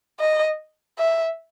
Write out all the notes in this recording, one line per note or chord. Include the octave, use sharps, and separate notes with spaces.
D#5
E5